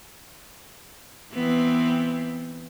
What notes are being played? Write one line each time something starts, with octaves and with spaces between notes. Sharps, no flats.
E3 B3 C4